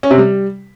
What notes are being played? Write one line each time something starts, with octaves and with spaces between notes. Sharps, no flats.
C#4
C3
G3